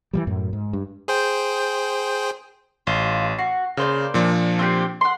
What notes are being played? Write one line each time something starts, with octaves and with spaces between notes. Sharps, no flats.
E3 F3 G3
F#2 A2
G#2
G2
G#4 C5 G5
A1 F4
F#4 C7
C#3 A#3 C5 D5
A#2 F3 D4
C4 F#4 G4
F#5 C6